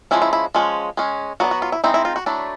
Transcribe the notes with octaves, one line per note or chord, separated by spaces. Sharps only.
F3 G#3 C#4 E4
E4
E4
F3 G#3 C#4
G#3 C#4
F#3 B3 D4 F#4
F#4
F4
E4
G#3 C4 D#4 E4
E4
F4
F#4
F#3 A3 D4 E4